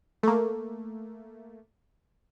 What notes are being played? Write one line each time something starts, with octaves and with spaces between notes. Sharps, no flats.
A3 A#3